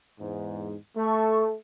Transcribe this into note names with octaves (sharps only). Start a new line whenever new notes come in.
E2 G#2
A3 A4 C#6